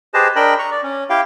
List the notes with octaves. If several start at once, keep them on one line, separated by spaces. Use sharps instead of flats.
G4 G#4 B4 C5 D#5 A5
D4 A#4 D#5 G5 B5
A#5 C#6
D5
C#4
E4 G4 F5 G5